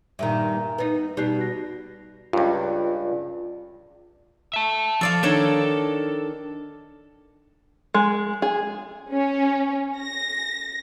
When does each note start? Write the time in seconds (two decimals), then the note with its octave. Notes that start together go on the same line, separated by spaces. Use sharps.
0.19 G2 A#2 D#3 E5 A#5
0.78 B3 D#4 B4
1.17 B2 G3 D#4 F#6 C7
1.39 F#4 A#6
2.33 C#2 G2 F4 D5
4.54 E5 A5
5.01 F3 A4 D5 F5
5.23 D#3 D4 A4 C#5
7.94 G#3
8.42 G#4
9.12 C#4
9.98 A#6